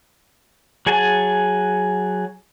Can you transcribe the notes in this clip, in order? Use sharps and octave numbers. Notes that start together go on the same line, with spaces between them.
F#3 G#4 F#5 G#5 A5